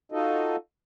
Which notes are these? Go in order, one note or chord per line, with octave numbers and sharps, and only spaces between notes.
D#4 F4 F#4 A4 D#5